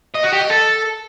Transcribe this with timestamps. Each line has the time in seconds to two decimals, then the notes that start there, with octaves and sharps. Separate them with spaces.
0.14 D#5
0.23 F#4
0.32 G4
0.41 D#5
0.50 A4